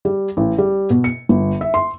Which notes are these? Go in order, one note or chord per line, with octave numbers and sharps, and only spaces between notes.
G3
A1
G3
B2
C#7
G1
E5
C6